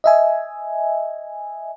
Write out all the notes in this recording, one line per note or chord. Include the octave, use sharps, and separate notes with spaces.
D#5 E5 G#5